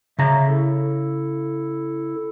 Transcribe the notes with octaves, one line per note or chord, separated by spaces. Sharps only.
C#3 E5 A#5
E4 A4